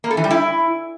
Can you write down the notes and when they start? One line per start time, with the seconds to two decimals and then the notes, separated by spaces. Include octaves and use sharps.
0.04 A#3
0.11 A4
0.17 E3
0.24 G3
0.30 E4